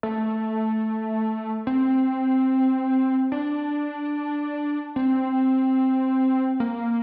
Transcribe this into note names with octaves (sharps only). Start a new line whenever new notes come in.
A3
C4
D4
C4
A#3